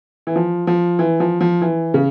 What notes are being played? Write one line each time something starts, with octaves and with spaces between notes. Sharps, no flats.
E3
F3
F3
E3
F3
F3
E3
C#3